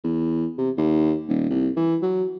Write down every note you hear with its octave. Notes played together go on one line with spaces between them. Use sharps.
E2
C3
D#2
D#1
C2
E3
F#3